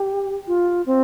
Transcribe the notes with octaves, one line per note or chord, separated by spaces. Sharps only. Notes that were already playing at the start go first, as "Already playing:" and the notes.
Already playing: G4
F4
C4